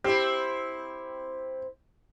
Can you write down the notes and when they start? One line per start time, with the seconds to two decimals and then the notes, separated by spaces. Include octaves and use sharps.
0.04 C4 E4 G4